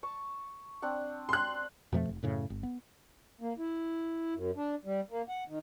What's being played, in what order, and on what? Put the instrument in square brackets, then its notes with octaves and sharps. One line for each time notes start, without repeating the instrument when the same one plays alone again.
[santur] A5 C#6
C4 D4 F#5
[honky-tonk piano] C6 F#6
[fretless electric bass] F2 B2 F3 A3
F1
F#2 A2 C#3
G1
B3
[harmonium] A#3
E4
F#2
D4
G3
A#3
F#5
D#3